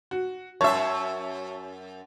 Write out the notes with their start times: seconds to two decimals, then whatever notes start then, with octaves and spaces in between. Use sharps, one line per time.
0.11 F#4
0.61 F#2 C#5 E5 A5 C#6